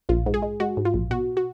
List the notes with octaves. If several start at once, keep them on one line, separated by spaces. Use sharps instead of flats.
A#1 F4
G#2
G#4
G#3
G#3 F#4
G#2
F4
A#1
B2 F#4
F#4